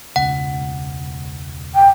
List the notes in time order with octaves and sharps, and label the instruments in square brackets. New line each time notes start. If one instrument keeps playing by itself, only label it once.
[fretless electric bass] E1 C#2 [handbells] F#5
[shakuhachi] G5